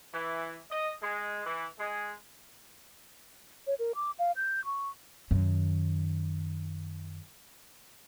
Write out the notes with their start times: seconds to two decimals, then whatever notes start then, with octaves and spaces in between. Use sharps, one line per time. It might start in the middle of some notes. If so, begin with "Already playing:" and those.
0.14 E3
0.71 D#5
1.02 G#3
1.45 E3
1.79 G#3
3.67 C#5
3.79 A#4
3.95 D6
4.19 F5
4.36 G6
4.65 C#6
5.31 F#2 D#3